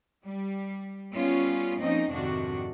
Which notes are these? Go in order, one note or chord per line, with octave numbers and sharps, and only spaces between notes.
G3
G3 B3 C#4 F4
F3 A#3 C4 C#4 D#4 D#5
F2 G#2 C3 D#3 D4 F#4